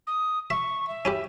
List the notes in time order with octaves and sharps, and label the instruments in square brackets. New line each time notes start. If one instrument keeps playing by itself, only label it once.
[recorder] D#6
[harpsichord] E5 [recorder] C#6
[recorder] E5
[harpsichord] C#4 E4 G4